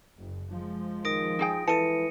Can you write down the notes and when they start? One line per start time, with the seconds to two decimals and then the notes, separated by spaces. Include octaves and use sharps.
0.18 F#1
0.51 F3 G#3
1.05 D#3 D#6 A#6 D7
1.39 D#4 G#4 G5
1.68 E3 A4 A5 C#7 D#7